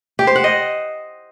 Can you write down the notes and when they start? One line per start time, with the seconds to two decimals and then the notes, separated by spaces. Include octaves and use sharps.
0.19 G4
0.27 C5
0.36 F#5
0.44 D#5